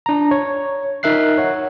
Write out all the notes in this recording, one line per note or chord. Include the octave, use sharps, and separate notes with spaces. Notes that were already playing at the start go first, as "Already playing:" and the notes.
D4 A#5
C#5
D#4 A#4 E5 F#6 C7
C#5 F#5